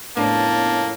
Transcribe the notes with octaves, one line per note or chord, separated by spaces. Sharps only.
F2 A2 C#3 A#3 B3 D4 A5